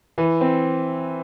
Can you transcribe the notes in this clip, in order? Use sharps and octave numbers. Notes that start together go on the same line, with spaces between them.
E3
C4